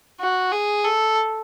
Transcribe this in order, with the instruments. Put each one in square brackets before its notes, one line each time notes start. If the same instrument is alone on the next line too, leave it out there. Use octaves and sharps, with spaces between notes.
[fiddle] F#4
G#4
A4